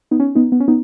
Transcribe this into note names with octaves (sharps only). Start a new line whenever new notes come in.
B3 D#4
C#4
B3 D#4
B3
C#4
B3 D#4